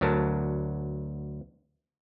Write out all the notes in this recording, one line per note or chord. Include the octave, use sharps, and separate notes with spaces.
D2 F#3 A#4 A5